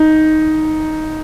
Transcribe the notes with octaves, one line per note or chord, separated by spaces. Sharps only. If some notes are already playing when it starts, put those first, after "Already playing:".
Already playing: D#4